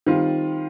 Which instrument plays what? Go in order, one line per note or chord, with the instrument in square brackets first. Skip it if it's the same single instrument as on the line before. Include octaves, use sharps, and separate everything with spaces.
[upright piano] D#3 G3 C4 F4